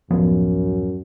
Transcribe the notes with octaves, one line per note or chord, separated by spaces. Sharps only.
D1 F#2 F3 B3